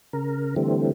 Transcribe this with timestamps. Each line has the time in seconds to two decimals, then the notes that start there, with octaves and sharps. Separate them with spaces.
0.13 C#3 A#4
0.56 D3 E3 G3 A3 C4